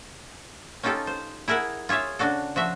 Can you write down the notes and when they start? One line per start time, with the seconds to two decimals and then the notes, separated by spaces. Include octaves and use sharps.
0.83 C#4 D#4 F4 G4 A4
1.07 C5
1.48 E4 G#4 A#4 E5 F#5
1.89 F4 G#4 C#5 E5 F5
2.19 C#3 D4 F#4 A4
2.56 F3 F#4 E5